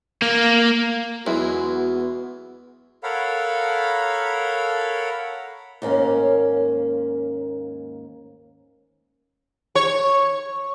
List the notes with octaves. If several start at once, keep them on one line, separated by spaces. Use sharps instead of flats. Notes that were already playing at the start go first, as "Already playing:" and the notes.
A#3
E2 F#3 G#3 B3 E4 F#4
A4 A#4 C#5 F5 F#5 B5
D#2 G#2 A#3 C#4
C#5